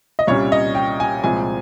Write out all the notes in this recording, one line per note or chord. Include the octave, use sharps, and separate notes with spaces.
D#5
C2 A#2 G3 C#4 C#5
D#5
G5
G#5
C2 A#2 F3 G#3 G#5